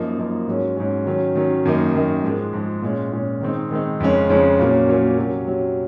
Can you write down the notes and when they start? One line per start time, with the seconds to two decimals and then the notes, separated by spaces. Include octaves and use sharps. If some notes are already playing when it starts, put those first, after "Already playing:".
Already playing: F#2 F3 A#3 D#4
0.18 F#2 F3 A#3 D#4
0.47 G#2 F#3 C#4
0.77 G#2 F#3 C#4
1.06 D#3 F#3 C#4
1.35 D#3 F#3 C#4
1.65 F#2 D#3 A#3 D#4
1.94 F#2 D#3 A#3 D#4
2.24 G#2 F3 G#3
2.53 G#2 F3 G#3
2.82 A#2 G#3 C#4
3.12 A#2 G#3 C#4
3.41 D#3 G#3 C4 D#4
3.71 D#3 G#3 C4 D#4
4.00 F2 C#3 G#3 C#4
4.29 F2 C#3 G#3 C#4
4.59 A#2 F#3 A#3 C#4
4.89 A#2 F#3 A#3 C#4
5.18 C3 F#3 C#4
5.47 C3 F#3 C#4